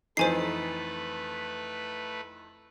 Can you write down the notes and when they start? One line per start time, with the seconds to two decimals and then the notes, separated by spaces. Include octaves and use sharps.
0.17 F2 E3 A3 D#4 B4 C5 G#5 C7